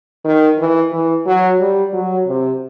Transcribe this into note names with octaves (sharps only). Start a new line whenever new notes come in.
D#3
E3
E3
F#3
G3
F#3
C3